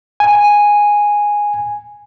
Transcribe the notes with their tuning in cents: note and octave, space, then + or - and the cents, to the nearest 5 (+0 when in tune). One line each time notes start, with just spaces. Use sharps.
G#5 -5